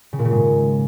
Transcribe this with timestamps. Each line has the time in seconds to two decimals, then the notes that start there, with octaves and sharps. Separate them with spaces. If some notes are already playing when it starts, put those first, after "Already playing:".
0.13 C#3
0.19 A#2
0.25 C#3
0.31 G#2